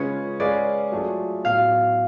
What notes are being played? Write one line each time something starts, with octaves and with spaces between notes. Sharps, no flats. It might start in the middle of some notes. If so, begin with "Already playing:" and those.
Already playing: C#3 G#3 C#4 F4 B4 C#5
G#3 C#4 G#4 B4 D5 F5
F#3 A3 F4 G#4
A2 F#3 B3 F5